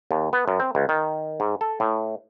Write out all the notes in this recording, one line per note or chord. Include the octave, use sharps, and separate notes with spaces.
D#2
B3
F#2
C4
C#2
D#3
G#2
A4
A2